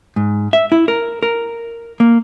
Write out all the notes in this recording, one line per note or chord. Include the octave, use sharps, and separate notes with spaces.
G#2
E5
E4
A#4
A#4
A#3